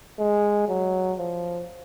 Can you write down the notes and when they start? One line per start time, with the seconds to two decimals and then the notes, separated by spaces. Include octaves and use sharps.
0.19 G#3
0.68 F#3
1.19 F3